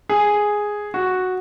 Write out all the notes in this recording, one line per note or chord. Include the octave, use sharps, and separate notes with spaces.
G#4
F#4